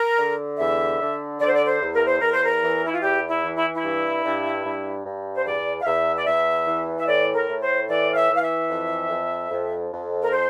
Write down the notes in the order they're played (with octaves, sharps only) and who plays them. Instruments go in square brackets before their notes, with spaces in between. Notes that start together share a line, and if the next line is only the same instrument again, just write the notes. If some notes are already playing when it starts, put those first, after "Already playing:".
Already playing: [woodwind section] A#4
D3
E2 E5
D3
D3 D5
C5
D5
C5
E2
A#4
C5
E2 A#4
C5
A#4
E3
E4
F4
E2 G4
E4
E3
E4
E4
G2
G2
G2
G2
C5
E2 D5
F5
E2 E5
D5
E2 E5
E3
E5
A2 D5
A#4
A2
C5
E3 D5
F5
E5
E3
F5
E5
F2
F2
F2
F2
A#4
C5